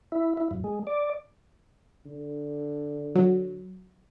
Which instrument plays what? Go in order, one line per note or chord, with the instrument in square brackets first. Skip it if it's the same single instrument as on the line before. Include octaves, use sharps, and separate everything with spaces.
[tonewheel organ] E4
E4
F#2
G#3
D5
[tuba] D3
[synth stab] F#3